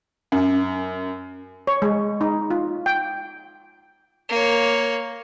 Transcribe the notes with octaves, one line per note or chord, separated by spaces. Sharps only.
F#2
C#5
G#3
D#4
F4
G5
A#3 C#5